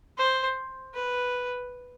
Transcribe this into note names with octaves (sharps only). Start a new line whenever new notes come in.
C5
B4